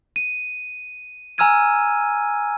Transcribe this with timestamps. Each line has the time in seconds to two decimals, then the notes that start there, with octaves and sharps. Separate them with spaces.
0.16 D#7
1.38 G#5 A#5 E6 F6 G#6 D#7